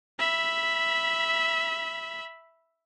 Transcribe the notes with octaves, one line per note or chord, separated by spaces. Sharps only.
E5 B5